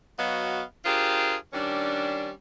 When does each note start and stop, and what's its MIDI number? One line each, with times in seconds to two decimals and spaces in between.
0.18 0.62 54
0.18 0.62 59
0.18 0.62 66
0.18 0.62 75
0.18 0.62 77
0.85 1.36 62
0.85 1.36 65
0.85 1.36 67
0.85 1.36 68
0.85 1.36 70
0.85 1.36 72
1.53 2.31 51
1.53 2.31 55
1.53 2.31 61
1.53 2.31 62